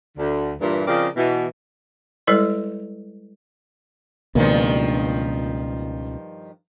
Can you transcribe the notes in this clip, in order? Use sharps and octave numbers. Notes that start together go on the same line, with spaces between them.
D2 D3
G2 A#2 E3
C#3 F3 C4 A#4 D5 D#5
B2 E3
G3 G#3 E4 A4 B4 C#5
C#2 G2 B2 D#3 F3 A#3